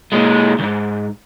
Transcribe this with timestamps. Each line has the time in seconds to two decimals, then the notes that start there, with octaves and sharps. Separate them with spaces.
0.13 A#2 G#3
0.59 C#2 G#2